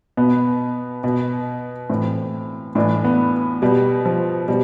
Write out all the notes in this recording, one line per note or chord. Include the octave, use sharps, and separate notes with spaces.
B2 B3
B2
A2 E3 C4
A2 E3 D4
B3
B2 G3
F3
B2 G3